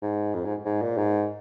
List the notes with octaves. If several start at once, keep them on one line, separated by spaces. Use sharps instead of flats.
G#2
F2
G#2
G#2
A#2
G#2